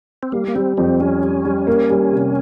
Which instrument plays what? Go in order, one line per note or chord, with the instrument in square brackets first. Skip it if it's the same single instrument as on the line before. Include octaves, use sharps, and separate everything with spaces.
[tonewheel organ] C4
[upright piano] G3 [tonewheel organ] A#3
[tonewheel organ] A#3
[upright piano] G3 [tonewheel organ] C4
[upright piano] F2 [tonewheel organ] C4
[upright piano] G3 [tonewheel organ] C#4
[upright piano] G3
G3
A#3
G3
C3